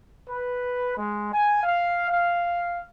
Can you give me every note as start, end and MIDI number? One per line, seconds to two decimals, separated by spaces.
0.28 0.95 71
0.98 1.29 56
1.33 1.62 80
1.64 2.06 77
2.09 2.86 77